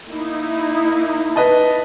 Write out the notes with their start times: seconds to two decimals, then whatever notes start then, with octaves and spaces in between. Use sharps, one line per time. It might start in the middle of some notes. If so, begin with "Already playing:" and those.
0.10 A#3 D#4 E4
1.36 B4 D#5 A5